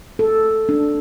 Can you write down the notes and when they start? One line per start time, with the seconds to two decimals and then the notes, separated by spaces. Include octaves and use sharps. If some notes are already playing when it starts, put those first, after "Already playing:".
0.19 A4
0.69 D4